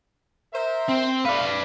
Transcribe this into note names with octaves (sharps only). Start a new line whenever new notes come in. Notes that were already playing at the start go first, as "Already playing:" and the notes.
A#4 C5 E5
C4
A3 B4 D5 F5